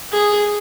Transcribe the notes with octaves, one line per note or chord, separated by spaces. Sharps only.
G#4